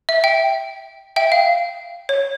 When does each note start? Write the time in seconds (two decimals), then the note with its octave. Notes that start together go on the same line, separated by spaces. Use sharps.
0.09 E5
0.24 E5 G5
1.16 E5 G5
1.32 F5
2.09 C#5